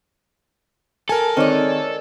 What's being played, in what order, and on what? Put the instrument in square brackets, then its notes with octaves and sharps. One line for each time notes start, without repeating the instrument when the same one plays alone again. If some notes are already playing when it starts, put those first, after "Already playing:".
[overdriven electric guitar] A4 [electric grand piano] A#4 G#5
[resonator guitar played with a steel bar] D#3 G#3 [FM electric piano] C4 C#5 D5